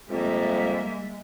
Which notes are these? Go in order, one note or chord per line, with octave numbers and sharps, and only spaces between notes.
F2 G3 G#3 A#3 E5